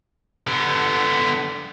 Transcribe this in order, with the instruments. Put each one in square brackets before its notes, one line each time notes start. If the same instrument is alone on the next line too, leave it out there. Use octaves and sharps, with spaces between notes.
[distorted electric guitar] D3 B3